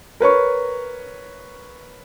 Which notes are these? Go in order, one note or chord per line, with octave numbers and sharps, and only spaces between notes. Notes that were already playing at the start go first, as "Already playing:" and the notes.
A#4 B4 C#5 C#6